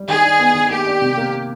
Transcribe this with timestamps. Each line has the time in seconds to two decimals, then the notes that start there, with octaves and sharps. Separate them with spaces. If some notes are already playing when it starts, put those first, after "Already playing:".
Already playing: G3
0.08 D#3 G#4
0.23 D4
0.39 B3
0.55 D#3
0.71 A#3 G4
0.86 D4
1.02 C3
1.18 A#3